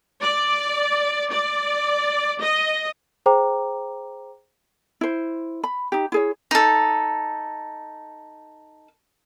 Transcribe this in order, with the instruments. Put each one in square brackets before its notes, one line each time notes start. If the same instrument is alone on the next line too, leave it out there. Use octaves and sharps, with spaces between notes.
[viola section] D5
D5
D#5
[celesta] G#4 C5 G5 A#5 D6
[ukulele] E4 C5
B5
D#4 G4
E4 G#4 C#5
[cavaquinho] D#4 A4